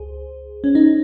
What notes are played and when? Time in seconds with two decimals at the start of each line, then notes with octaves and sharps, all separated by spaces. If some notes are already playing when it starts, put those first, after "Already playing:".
Already playing: C#2 G#4 C5
0.64 C#4
0.75 D#4